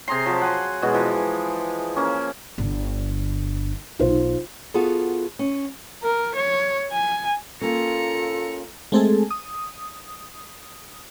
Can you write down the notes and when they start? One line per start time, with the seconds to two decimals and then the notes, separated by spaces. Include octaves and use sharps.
0.08 C3 G#4 A#5 C6
0.26 F3 F#3 A5
0.42 F#5 G#5 C6
0.82 B2 E3 G#3 F#4
0.94 E3 F3
1.96 A#3 C#4
2.58 G1 D3
3.99 B1 D#4 F4 C5
4.74 B3 F4 F#4 G#4 A4
5.39 C#4
6.03 A#4
6.36 C#5
6.92 G#5
7.61 A#3 C#4 F4 A4 A#5 C#7
8.92 G#3 A3 C4 G#4 A4
9.31 D#6